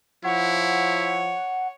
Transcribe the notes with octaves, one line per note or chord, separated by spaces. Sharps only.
F3 E4 C#5 F#5